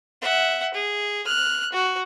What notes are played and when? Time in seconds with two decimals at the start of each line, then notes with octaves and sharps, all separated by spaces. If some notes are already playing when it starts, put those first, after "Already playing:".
0.22 E5 F#5
0.74 G#4
1.26 F6 F#6
1.73 F#4